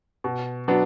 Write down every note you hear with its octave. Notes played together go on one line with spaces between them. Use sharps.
B2
F#3 B3 D4